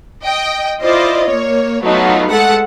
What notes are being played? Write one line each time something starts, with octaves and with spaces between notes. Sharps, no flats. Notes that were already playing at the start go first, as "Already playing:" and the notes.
D#5 G5
E4 F4 C5 D5 D#5
A#3 C#5
F#3 A3 B3 D#4 F4
G#3 A3 A4 F#5